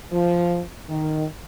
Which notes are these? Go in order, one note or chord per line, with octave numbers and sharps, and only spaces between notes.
F3
D#3